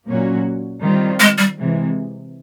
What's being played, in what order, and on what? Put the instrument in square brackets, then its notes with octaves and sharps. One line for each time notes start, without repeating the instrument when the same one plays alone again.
[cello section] A#2 F#3 A#3 C#4 F#4
D#3 G3 C4 F4
[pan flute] G#3
G3
[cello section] C3 E3 G#3